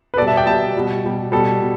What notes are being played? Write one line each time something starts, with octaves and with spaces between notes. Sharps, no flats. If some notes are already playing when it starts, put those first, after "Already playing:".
B4
B2 G3 A4 D5
E5 A5
D5 G5
B2 G3 E5 A5
B2 G3
B2 G3
B2 G3 A4
B2